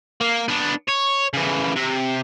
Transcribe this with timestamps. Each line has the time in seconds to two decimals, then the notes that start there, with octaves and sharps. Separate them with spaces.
0.21 A#3
0.48 B3 D4
0.89 C#5
1.34 C#3 E3
1.76 C3